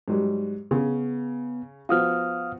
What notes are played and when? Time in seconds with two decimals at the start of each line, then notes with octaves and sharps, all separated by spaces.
0.08 G#2 F#3 G3
0.71 C#3 B3
1.89 F3 B3 F#4 F5 D#6 F6